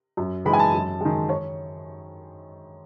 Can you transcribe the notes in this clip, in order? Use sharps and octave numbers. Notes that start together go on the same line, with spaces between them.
F#2
E3 G#3 D#4 B5
G#5
A5
F#2
D#3 G#3
C#5